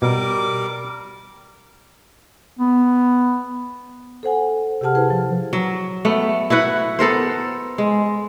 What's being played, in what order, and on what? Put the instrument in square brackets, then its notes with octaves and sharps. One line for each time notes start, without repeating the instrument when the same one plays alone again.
[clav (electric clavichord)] B2 [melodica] G3 A#4 D6
[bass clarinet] B3
[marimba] A4 C5 F#5 G#5
C3 G4 G#4 F#5 A5 F6
E4 G#4 B4 C5
F3
[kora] F#3
A3 B3
E4 F#4 B4 F#5
B3 A4 A#4 C5
G#3